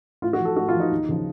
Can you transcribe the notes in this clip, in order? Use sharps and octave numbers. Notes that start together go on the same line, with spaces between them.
A2 F4
F#4
F3 A4
A2 F#4
F4
F3 D#4
D#2
C#3 F3